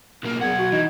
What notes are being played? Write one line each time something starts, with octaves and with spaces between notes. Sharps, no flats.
B1 A#3 A#4
B1 E2 F#5 G#6
F#4
E3 D#4